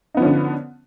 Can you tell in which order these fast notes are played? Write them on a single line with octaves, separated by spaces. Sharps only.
D#4 B3 F3 C#4 D3